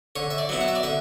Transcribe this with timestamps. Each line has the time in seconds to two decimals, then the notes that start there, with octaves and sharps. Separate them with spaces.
0.16 D3 C#5
0.30 E5
0.38 D5
0.49 F#3 B3 E4
0.61 F#5
0.68 E5
0.75 D5
0.83 D3 E5